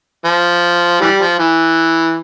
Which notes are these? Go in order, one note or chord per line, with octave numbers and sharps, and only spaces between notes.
F3
E3 G3
F3
E3